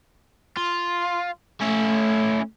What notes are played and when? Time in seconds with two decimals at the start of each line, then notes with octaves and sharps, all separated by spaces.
0.57 F4
1.61 A3 C#4 E4